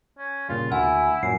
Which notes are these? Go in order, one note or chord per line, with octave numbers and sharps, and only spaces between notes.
C#4
A#2 C#3 G3 F4
D2 A#3 E4 F#5 G#5
F#2 A#2 F#3 G#5 C7